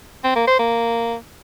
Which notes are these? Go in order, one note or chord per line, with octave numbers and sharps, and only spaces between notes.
C4
A#3
C5
A#3